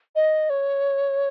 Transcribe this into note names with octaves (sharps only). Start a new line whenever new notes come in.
D#5
C#5